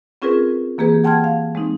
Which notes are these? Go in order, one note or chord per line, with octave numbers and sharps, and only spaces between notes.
C4 C#4 F4 G#4 A#4 B4
E3 A#3 G4 G#4 B4
F#5 G5 A5 C6 F6 G#6
F5
G#3 C4 D#4